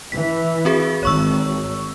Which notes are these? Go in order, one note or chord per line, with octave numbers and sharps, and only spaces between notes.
E3 B6
C4 F#4 G#4
G#1 C#5 C#6 E6